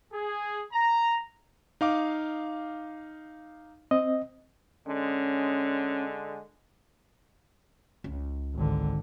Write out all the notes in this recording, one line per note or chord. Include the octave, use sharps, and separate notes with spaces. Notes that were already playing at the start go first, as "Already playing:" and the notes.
G#4
A#5
D#4 F5 D6
C4 D#5
D3 G#3 C#4
C#2
G#1 D3